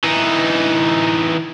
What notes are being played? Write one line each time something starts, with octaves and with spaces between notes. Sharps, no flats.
E3 D#4